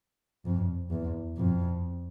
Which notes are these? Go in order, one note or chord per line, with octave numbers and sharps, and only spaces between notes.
F2
E2
F2